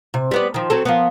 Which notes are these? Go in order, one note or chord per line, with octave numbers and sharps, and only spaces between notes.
C3
G3 B3 D5
D#3 F3
F#3 C4 A4
F3 A#3 B3